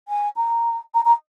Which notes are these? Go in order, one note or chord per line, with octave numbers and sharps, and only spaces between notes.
G#5
A#5
A#5
A#5